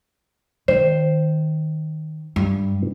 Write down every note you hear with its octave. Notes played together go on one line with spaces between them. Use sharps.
D#3 C5
G2